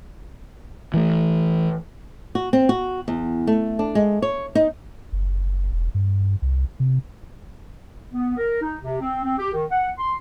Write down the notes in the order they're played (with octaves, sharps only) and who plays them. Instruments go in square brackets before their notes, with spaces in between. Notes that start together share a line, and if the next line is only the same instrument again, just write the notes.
[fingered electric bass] E3 A3
[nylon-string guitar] F#4
C4
F#4
E2
A3
D4
G#3
C#5
D#4
[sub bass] F#1
E1
G2
C2
C3
[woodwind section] B3
A#4
D#4
C3
C4
C4
G4
D#3
F#5
C6